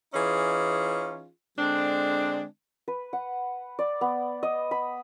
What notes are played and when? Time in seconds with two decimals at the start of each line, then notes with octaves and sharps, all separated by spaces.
0.14 E3 C#4 D#4 F4 G#4
1.58 D3 G#3 C4 D4
2.88 B4
3.13 F#5
3.79 D5
4.01 B3
4.43 D#5
4.71 B5